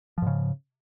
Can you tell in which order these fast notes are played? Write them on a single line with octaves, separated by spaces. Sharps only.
F3 G#2 C#3